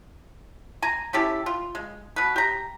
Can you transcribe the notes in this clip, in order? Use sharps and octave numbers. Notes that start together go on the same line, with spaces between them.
G#5 A#5
C#4 E4 G4 A4
F4
G#3
B2 B4
G4 A#5